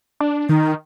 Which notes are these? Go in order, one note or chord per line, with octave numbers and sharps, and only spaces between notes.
D4
D#3 D#4